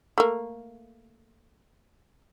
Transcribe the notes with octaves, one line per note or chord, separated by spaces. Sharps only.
A3 A#3